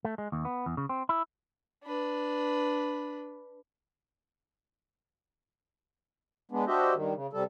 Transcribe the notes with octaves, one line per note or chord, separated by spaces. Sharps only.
A3
G#3
D#2
B3
E2
C#3
C4
E4
D4 B4
G#3 B3 D4
D4 F#4 G4 C5 D#5 E5
G2 D#3
C#3
C3 G3 A4